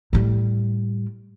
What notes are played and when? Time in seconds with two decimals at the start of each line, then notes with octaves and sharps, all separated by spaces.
0.13 A2 G3